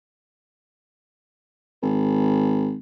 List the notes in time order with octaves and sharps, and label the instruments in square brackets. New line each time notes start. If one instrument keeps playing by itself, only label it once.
[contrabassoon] G#1